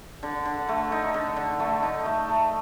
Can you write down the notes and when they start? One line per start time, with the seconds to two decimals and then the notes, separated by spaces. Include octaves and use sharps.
0.23 D3
0.45 D3
0.68 A3
0.92 D#4
1.14 D3
1.36 D3
1.60 A3
1.82 D#4
2.06 A3
2.29 A3